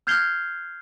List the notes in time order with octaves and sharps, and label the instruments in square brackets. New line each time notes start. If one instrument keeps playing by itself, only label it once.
[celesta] F6 G6 G#6 C7 F7 G7